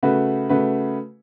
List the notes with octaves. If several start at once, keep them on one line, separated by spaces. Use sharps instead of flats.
C#3 A3 F#4 B4
C#3 A3 F#4 B4